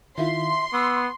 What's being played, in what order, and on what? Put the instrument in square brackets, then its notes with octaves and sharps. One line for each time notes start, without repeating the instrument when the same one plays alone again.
[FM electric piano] D#3 E4 F4 [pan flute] E5 [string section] C6
[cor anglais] B3 [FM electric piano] C#6 [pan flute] E6